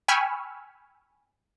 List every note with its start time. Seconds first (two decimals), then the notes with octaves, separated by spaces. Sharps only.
0.08 G5 G#5 B5 C#6 E6 F6